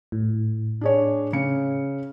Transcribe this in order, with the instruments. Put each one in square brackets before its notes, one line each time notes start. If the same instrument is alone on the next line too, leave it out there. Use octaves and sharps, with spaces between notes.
[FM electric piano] A2
[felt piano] D4 G#4 C#5
C#3 C#7